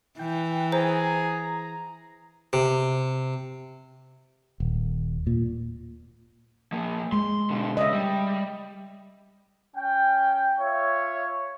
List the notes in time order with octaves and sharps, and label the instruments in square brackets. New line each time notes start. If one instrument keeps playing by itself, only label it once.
[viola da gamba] E3 [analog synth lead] G5
[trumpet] G#4 [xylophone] C5 [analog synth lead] A#5
[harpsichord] C3
[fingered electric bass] D#1
A#2
[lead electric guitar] F3 A#3
[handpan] G#3 [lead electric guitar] C6
[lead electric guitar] B2 D3
[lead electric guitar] C#3 [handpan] D#5 E5
[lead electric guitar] G3
[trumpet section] C#4 G5
F4 C#5 E5